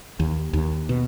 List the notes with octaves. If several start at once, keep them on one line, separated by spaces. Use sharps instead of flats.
D#2
D#2
B2